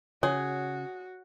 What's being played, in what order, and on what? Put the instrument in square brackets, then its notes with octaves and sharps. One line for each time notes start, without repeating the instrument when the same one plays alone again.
[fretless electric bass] C#3 [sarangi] F#4 [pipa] G#4 [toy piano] C#5